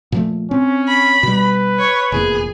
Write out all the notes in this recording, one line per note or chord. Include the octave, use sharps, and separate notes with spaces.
A#2 F3 A3
C4 C#4
B5
B2 G3 B4
C#5
F1 E2 A#2 G#4